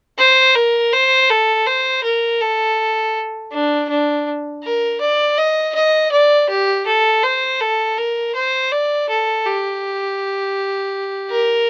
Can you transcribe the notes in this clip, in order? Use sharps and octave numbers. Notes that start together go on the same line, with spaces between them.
C5
A#4
C5
A4
C5
A#4
A4
D4
D4
A#4
D5
D#5
D#5
D5
G4
A4
C5
A4
A#4
C5
D5
A4
G4
A#4